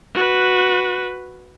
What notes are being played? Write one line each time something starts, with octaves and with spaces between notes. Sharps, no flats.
F#4 B4